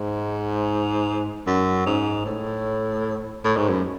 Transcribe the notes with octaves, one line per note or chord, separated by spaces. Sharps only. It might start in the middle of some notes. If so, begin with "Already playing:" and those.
Already playing: G#2
F#2
G#2
A2
A2
G#2
F#2